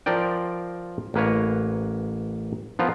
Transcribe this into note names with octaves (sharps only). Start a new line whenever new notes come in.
F3 F4 A#4 D5 G5
A1 A#3 B4 C#5
F3 B3 F4 A#4